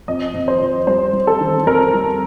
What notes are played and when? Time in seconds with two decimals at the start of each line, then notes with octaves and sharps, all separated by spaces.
0.08 F2 D#5
0.34 F2
0.48 C5
0.61 F2
0.87 G3 C5
1.13 G3
1.27 A4
1.41 D#3
1.67 F2 A#4
1.94 G3